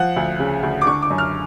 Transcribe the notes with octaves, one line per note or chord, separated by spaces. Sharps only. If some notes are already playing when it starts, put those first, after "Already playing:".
Already playing: F3 F#5
D2
C#3
D2
D6
D3 C#6
D6
F#2
F6